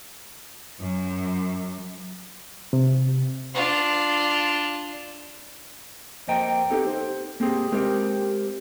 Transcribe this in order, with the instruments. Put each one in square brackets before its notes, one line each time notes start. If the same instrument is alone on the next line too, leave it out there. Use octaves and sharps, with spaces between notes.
[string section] F#2
[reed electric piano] C3
[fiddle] D4 F4
[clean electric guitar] F2 A#3 C5 D#5 G5 A#5
B3 C4 D#4 G4 A4
C5
A#3 C4 G4 G#4
G#3 C4 G4 A#4 C5